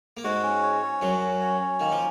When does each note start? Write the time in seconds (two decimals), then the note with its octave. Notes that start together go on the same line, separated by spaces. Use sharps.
0.17 A#3
0.24 G#2 G#3 F#4
0.43 C#4
0.63 C#5
0.82 C#4
1.01 F#2 F#3 F#4
1.21 C#4
1.41 C#5
1.61 C#4
1.80 D#3 A#3
1.92 F3